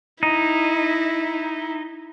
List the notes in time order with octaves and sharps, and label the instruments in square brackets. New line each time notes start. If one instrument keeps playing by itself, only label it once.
[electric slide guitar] D#4 [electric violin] E4